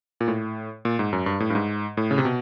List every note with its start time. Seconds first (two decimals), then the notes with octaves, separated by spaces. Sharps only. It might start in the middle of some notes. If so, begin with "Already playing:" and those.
0.21 A#2
0.28 A2
0.85 A#2
0.99 G#2
1.13 F#2
1.26 G2
1.40 A2
1.50 G2
1.55 G#2
1.97 A2
2.11 C#3
2.18 C3
2.25 B2